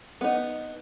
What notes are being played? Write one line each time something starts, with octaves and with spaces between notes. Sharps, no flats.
B3 D#4